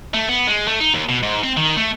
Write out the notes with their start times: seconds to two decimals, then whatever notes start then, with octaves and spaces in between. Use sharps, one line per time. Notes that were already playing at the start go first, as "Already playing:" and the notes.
0.14 A3
0.29 B3
0.47 G#3
0.68 A3
0.80 D#4
0.94 D#2
1.09 B2
1.23 G#2
1.43 C4
1.57 D#3
1.77 A3